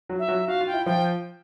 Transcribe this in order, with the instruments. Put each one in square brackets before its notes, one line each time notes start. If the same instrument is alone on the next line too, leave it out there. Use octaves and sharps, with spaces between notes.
[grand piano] F#3 F#4
[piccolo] E5
[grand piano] F#3 F#4
[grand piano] F#4 [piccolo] F5
[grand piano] F4
[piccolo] G5
[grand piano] E4
[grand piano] F3 F4 [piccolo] G5